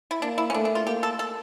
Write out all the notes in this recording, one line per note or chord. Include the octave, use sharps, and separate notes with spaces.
E4
A#3 D4
E4
C#4
A3 D4
D4
F4
A#3 G4
A4
A4